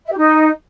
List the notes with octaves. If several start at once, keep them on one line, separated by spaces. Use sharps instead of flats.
E5
G4
D#4